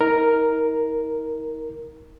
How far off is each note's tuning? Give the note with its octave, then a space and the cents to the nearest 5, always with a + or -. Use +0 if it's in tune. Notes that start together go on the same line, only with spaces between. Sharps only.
D#4 +40 A#4 +0